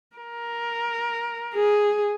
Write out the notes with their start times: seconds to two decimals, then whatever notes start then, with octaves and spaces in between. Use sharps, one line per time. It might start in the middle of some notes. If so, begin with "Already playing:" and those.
0.17 A#4
1.55 G#4